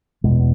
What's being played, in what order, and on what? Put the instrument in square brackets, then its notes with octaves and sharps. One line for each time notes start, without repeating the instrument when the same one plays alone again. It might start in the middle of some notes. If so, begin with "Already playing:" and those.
[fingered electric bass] E2 B2 G#3 B3